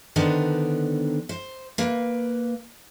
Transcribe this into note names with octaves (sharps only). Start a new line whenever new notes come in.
D3 D#3 B3 D4 B4 C5
C5
A#3 B4